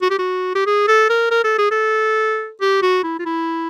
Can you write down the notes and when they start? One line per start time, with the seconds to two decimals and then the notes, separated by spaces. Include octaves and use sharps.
0.02 F#4
0.10 G4
0.19 F#4
0.55 G4
0.66 G#4
0.88 A4
1.10 A#4
1.31 A#4
1.44 A4
1.58 G#4
1.71 A4
2.61 G4
2.82 F#4
3.03 E4
3.19 F4
3.25 E4